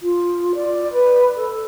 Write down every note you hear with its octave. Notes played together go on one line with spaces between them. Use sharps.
F4
D5
B4
A4